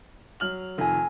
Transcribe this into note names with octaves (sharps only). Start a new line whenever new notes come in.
F#3 F6 F#7
F1 D#3 A4 G#5